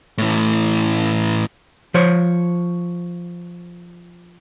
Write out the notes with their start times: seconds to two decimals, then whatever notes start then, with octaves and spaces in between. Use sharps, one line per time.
0.18 A2 E3
1.94 F3 C5 C#5